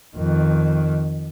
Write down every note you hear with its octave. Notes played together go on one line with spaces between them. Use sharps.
F2 D#3